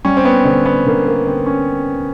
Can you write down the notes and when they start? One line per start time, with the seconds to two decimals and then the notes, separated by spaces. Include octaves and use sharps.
0.05 G3 C#4
0.17 C4
0.25 B3
0.45 D3 C4
0.66 B3
0.86 D3 A#3
1.07 A#3
1.27 D3 C4
1.46 C#4